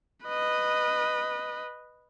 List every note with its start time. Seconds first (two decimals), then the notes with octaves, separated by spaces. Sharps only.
0.25 B4 D#5